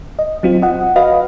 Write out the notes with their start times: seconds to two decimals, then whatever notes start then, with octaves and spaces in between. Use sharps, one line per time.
0.19 D#5
0.43 F#3 C4 F4
0.62 D#5 F#5
0.96 F#4 B4 D#5 F5